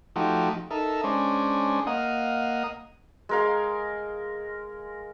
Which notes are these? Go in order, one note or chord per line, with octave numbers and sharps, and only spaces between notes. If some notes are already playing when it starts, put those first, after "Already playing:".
F3 A3 D#4 F#4 G4
D#4 A4 A#4 E5
G#3 C#4 D4 C5
A#3 D#5 F5 F#5 D#6
G#3 A#4 F5